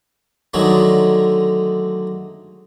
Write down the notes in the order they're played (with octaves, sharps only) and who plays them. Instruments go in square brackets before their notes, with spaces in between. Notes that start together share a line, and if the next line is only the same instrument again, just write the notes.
[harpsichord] D3 D#3 F#3 G#3 A3